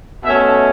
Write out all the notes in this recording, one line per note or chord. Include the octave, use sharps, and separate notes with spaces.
B2 A3 C#4 E5